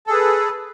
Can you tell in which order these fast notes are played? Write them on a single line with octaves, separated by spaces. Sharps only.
A4 G#4 B4